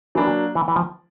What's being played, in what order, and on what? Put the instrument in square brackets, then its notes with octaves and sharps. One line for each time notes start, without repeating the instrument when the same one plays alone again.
[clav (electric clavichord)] E3 [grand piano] F#3 A#3 D4
[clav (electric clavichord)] E3
E3
F3